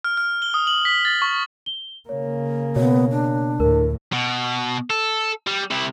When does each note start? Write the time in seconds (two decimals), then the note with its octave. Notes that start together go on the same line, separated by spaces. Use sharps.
0.04 F6
0.17 F6
0.42 G7
0.54 D#6
0.67 F#7
0.85 B6
1.05 A6
1.22 C#6
1.66 G7
2.09 C#3 A#3 C#5
2.76 B2 B3 C#5
3.11 D4
3.60 D2 A2 A#4
4.13 B2
4.90 A4
5.47 G3
5.71 C3 E4